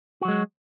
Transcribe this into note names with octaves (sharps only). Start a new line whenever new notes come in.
F#3 G#3 F#4